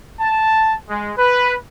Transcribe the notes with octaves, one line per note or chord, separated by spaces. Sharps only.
A5
G#3
B4